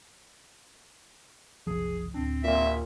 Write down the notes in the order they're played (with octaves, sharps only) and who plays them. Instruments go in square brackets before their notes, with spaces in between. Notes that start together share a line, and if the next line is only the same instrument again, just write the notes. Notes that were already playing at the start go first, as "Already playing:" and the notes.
[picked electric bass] F#1 C2 F3 [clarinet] G#4
[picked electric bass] D1 D4 [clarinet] C4
[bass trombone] A#2 [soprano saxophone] E5